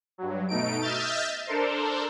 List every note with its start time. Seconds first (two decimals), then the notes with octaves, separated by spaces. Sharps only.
0.18 G2 F#3
0.49 B2 A3 D#4 D7
0.81 D#5 E5 F6 G6 A6
1.47 D4 A4 A#4 C5